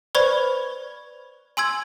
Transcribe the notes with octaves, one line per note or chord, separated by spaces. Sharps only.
B4 C5 D5 B5 C#6 G#6
G#5 C6 E6 G#6